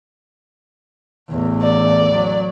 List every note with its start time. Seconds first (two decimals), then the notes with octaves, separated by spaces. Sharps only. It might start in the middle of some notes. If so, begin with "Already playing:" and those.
1.29 A1 E2
1.62 D5
2.12 F#3